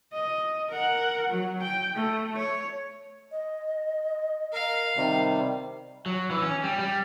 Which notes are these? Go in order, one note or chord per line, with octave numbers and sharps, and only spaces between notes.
D#5
A#4 F#5
F#3
G5
A3
C#5
D#5
A#4 F5
C3 D#3 G3
F#3
E3
C#4
G3
G3